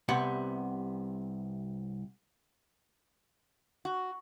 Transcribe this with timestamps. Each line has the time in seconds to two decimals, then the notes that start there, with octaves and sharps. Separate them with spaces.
0.08 C2 C3 B3 F#5
3.85 F#4